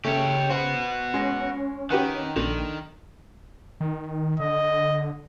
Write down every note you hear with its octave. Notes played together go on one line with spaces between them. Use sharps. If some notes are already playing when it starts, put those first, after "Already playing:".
C#3 A3 C#4 G4 C#5
F#4 B4 C5
G#3 C#4
D#3 G4 B4 F#5
A#1 D3 D#3
D#3
D3 D#5